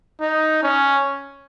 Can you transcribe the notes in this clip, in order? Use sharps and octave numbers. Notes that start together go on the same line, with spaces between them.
D#4
C#4